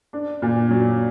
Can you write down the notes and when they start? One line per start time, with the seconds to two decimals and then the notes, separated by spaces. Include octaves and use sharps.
0.13 D4
0.42 A#2
0.71 F#3